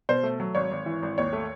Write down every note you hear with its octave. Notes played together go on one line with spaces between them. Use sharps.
B2 C5
A3
F#3
G#1 C#5
G#1
E3
G#1
D#2 C#5
A3